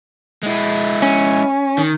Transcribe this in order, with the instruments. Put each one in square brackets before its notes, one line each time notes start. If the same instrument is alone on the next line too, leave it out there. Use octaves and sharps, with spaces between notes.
[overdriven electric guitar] G#3 E4
[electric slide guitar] C#4
[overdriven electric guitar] D#3